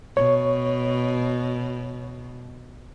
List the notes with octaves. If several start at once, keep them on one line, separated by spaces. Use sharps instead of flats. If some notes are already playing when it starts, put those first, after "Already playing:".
B2 C#5